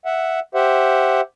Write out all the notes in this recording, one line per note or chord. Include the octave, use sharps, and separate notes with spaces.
E5 F#5
G4 C5 E5 F#5